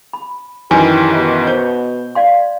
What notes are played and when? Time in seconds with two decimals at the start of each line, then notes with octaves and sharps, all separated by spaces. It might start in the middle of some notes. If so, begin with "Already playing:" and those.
0.13 B5
0.71 F#2 D#3 E3 G4 G#5
1.12 B2 E5
1.47 C5 G6
2.15 D5 F5 C6